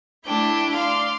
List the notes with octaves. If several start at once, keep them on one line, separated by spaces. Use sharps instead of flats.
A3 D4 E4 G5
D5 F5 C6